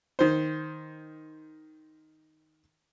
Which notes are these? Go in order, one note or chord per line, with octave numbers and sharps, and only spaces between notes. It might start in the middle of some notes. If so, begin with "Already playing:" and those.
D#3 C5